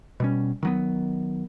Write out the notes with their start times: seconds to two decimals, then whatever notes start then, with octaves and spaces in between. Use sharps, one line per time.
0.20 B2 G3 C#4
0.63 D#3 F#3 B3